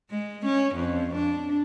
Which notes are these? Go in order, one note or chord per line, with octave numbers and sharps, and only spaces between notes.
G#3
C#4
F2
D4